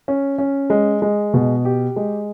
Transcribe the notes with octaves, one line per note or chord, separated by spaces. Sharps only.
C#4
C#4
G#3
G#3
B2
G4
G#3